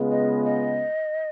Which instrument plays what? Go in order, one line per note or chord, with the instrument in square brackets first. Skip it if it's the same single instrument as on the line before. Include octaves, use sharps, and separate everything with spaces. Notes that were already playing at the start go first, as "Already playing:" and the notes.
Already playing: [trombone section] C#3 G#3 B3 F4 B4
[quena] D#5
D#5